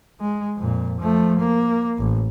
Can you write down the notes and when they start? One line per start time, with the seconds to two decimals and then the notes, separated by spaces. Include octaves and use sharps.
0.21 G#3
0.57 F2 A#2
1.00 F3 A3
1.39 A#3
1.98 A1